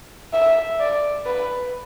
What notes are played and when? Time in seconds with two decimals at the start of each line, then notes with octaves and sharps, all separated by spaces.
0.33 E5
0.80 D5
1.26 B4